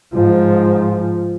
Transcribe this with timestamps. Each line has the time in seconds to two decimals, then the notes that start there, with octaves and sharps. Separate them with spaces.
0.13 G#2 F3